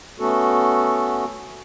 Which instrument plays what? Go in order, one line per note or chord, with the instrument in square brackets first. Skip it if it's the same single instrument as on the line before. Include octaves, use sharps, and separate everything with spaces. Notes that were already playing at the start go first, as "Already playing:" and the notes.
[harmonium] A3 B3 C#4 F#4 A4